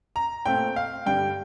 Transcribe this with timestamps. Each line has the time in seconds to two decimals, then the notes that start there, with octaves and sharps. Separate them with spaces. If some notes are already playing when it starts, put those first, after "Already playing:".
0.16 A#5
0.45 A#2 A3 C4 G5
0.76 F5
1.06 G2 D3 G3 G5